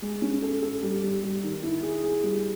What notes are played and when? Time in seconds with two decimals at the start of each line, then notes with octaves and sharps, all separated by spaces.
0.02 G#3
0.22 C#4
0.42 A4
0.62 A4
0.83 G3
1.03 G3
1.23 G3
1.43 D#3
1.63 E4
1.83 G#4
2.03 G#4
2.23 G3